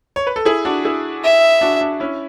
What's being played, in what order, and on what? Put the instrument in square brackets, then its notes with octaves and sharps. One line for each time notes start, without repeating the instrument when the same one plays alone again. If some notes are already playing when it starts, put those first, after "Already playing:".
[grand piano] C#5
B4
A4
E4 G#4
D4 F#4
E4 G#4
[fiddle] E5
[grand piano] D4 F#4
D4
C#4 E4